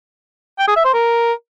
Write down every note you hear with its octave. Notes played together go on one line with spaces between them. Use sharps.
G5
G#4
E5
C5
A#4